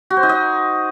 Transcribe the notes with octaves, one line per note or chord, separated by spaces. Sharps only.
F#4
C5
D#4
D#5